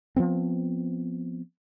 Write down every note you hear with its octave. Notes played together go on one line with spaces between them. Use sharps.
F3 F#3 B3 C4